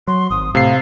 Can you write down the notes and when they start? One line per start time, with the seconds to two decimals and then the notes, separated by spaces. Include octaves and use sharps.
0.08 F#3 C6
0.31 G#1 D#6
0.55 A2 C3 F5 C7